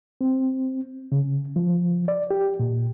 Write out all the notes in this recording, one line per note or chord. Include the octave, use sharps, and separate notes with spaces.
C4
C#3
F3
D5
G4
A#2